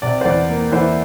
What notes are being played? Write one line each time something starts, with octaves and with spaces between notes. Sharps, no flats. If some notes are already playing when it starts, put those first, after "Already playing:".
C3 D5
C5
E2 D5
A#3
E3 C5